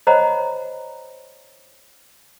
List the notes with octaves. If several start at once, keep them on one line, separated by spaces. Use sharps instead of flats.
C5 C#5 D#5 F#5 A#5 B5